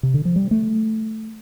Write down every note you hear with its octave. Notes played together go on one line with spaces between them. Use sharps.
C3
D3
F3
G3
A3